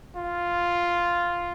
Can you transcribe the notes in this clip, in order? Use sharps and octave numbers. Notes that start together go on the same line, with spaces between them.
F4